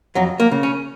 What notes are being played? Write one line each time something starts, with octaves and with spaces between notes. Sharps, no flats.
F2 F#3
A#3
C#3
C#4